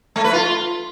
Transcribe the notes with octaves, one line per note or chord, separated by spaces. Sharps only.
A3
B4
F4